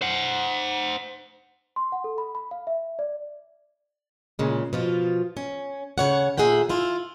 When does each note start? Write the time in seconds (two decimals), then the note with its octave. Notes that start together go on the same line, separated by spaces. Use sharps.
0.01 C5 F#5
1.76 C6
1.92 F#5
2.04 A4
2.18 B5
2.35 B5
2.51 F5
2.67 E5
2.99 D5
4.39 A#2 C#3 G#3
4.73 B2 F3 F4
5.37 C#4
5.98 C#3 C#5 F#5
6.38 A#2 E3 G#4 E5 F#5 G5
6.69 E4 F4